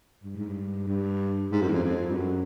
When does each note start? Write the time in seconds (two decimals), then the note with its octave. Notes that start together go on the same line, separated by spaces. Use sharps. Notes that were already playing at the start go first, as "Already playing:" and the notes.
0.24 G2
0.36 G#2
0.49 G2
0.87 G2
1.52 G#2
1.62 F#2
1.68 E2
1.73 F2
1.83 F2
2.11 G2
2.15 F#2